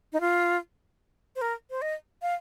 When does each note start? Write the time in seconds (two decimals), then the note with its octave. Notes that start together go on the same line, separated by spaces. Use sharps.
0.13 D#4
0.20 F4
1.36 C5
1.41 A#4
1.70 C5
1.82 D#5
2.22 F5